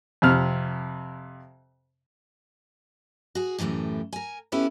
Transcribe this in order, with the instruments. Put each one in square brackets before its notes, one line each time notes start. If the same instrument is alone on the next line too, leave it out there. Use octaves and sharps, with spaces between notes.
[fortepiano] F2 C3 F6
[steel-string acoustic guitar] F#4 G#4
F#2 A2 E3 A3 G4
A#4 G#5
B3 C#4 E4 G4 A4 B4